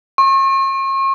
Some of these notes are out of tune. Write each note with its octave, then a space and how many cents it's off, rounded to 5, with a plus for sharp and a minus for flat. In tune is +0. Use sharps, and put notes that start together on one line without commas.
C#6 -40